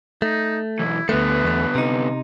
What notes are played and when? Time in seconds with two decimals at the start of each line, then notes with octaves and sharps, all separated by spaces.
0.22 A3 D#4
0.79 B1 E3 E4
1.09 D2 D3 A3 B3 B4
1.44 E2 A3
1.75 C3 D#4